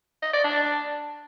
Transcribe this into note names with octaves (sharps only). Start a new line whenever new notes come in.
D#5
D5
D4